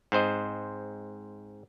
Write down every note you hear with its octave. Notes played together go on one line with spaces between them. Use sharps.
G#2 C4 C5 D#5